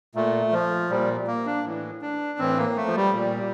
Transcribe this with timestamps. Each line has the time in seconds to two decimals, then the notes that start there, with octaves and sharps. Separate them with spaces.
0.15 A#2 A3
0.52 F3
0.90 A#2 G3
1.27 A#3
1.46 D4
1.65 A2 E3
2.01 D4
2.39 A2 E3 C4
2.58 A#3
2.76 A3
2.86 F3
2.96 G3
3.14 A#2